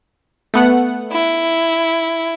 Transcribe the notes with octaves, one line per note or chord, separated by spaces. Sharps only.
A3 B3 F#5
E4